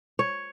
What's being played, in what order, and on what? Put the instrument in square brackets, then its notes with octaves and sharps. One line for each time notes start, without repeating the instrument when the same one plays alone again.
[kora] C#5